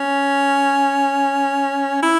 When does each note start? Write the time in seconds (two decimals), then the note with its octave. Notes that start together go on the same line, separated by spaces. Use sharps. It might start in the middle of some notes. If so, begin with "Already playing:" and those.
Already playing: C#4
2.03 E4